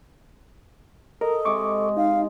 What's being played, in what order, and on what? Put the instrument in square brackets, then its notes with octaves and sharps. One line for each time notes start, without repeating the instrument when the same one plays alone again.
[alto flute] A4 [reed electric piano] A#4 [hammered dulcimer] D#5
[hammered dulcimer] C3 G#3 [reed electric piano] C#6 D6
[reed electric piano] D#4 [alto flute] F5